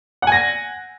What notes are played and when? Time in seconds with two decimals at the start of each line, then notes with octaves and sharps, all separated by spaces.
0.22 F#5
0.27 G#5
0.32 A#6